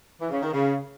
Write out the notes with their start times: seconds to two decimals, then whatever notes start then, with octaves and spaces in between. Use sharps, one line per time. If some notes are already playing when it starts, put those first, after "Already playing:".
0.19 E3
0.30 C#3
0.40 D#3
0.51 C#3